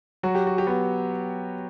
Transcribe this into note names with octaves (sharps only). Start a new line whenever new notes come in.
F#3 F#4
G4
F#4
G4
B3 F#4